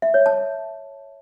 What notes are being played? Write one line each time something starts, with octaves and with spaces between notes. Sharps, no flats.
E5
C#5
A5